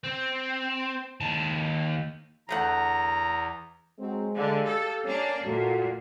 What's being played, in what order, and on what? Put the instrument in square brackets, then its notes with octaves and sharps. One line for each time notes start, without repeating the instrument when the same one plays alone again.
[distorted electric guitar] C4
D#2 A5
[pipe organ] E2 [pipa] D3 A3 F#5 [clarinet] A#5
[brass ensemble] F#3 C4 [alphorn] G#3
[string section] D3 [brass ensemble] G4 F5
[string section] A4
[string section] A#3 D4 [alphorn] C#4
[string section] A#2 [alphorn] A3 [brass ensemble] F4 F#4